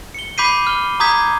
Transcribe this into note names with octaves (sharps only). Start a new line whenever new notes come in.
C#7 G7
B5 D6 G6 B6 C7 D#7
F6 G7
A#5 D6 D#6 G6 G#6 B6